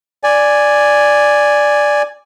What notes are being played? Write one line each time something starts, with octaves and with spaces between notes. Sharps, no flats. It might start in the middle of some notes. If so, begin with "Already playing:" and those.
D5 G#5